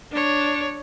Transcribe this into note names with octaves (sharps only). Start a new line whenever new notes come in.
D4 C#5